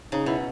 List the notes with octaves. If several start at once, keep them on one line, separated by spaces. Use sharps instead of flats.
C#3 D#4
B2 E4